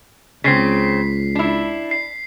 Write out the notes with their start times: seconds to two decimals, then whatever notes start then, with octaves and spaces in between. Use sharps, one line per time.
0.44 C#2 C#3 C4 B6 C7
1.35 D4 E4
1.91 C7